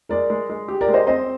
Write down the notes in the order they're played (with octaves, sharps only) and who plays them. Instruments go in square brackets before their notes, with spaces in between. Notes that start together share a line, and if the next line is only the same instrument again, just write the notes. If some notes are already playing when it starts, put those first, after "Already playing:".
[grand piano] G#3 [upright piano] A#4 D5
[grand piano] G#3
G#3
G4
[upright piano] A#4 D5
[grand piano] G#3
[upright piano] C5 D#5
[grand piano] C4 [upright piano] C5 D#5